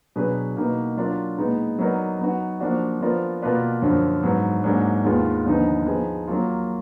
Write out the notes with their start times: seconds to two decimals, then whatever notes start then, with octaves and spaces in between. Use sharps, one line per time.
0.16 B2 F#3 D4 G#4 B4
0.56 B2 A#3 D#4 F#4 B4
0.97 F#3 D4 F4 A#4 D5
1.38 A#2 G#3 B3 D#4
1.79 F#3 B3 D#4 A#4 D5
2.19 F#3 B3 D#4 F#4
2.60 F3 A#3 D4 F#4
3.01 F3 B3 F4 A#4 D5
3.42 B2 A#3 F4 B4 D5
3.82 F#2 D3 F3
4.23 G#2 F#3 B3
4.64 G#2 F#3 A#3 D4 G#4
5.05 D#2 D#3 G#3 B3 F4
5.46 D#2 D3 F3 B3 D#4
5.86 F3 B3 D#4 G#4
6.28 F#3 A#3 F4